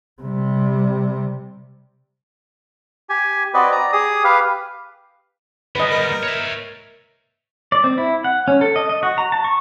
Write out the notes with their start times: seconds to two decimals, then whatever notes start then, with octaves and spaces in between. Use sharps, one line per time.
0.22 C3 G3
3.09 G4 G#5
3.54 C4 F#4 B4 D5 D#5
3.72 D5 A#5
3.92 G4 G#4 D#6
4.24 G4 B4 F5
5.76 G3 B3 B4 D#5
5.91 A#4
6.23 C#5 E5
7.72 D5
7.84 C4
7.98 E4
8.24 F#5
8.48 C#4
8.61 A4
8.76 D#5
8.89 D#5
9.03 F#4
9.18 A#5
9.32 A5
9.44 C#6